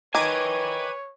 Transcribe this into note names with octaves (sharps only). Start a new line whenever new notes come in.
D#3 B4 C#5 G#5 D6 G#6 D#7